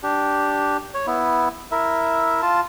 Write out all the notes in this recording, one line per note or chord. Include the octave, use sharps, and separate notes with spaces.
D4 G4
C#5
B3 E4
E4 A#4 E5
F4 A5